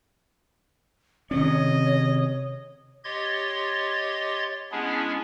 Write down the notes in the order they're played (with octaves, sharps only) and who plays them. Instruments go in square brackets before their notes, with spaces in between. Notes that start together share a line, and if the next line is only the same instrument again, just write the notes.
[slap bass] C3 D#3 C#4 [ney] C#5 [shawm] D#5
[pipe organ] G4 C#5 D#5 C6 G#6 A6
G#3 B3 C#4 D4 E4 G#4